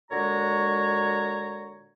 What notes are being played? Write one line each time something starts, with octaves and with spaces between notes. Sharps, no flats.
A#2 D3 G#3 F#4 C#5 A#5